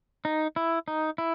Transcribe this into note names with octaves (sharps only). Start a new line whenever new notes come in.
D#4
E4
D#4
E4